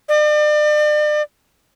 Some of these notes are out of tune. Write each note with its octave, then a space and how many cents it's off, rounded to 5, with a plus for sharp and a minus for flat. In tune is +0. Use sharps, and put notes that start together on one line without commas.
D5 +40